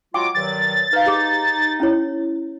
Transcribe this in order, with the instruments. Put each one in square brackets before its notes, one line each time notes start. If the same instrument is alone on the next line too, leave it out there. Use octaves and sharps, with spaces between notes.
[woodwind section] F#3 G#3 F4 [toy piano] G5 C#6 [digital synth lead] D6
[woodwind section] G2 D#3 F#3 [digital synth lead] A6
[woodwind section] D#4 [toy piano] B4 F5
[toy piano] G4 G#4 D6
C#4 E4 C#5